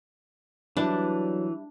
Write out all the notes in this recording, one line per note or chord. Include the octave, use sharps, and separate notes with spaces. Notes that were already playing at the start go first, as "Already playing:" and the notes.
E3 F#3 G3 D4 E4 B4 A5